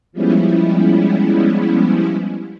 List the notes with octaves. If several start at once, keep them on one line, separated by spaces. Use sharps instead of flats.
F3 G3 G#3 B3 C#4 E4